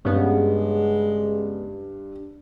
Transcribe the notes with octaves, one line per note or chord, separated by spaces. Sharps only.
G2 C#3 G#3 B3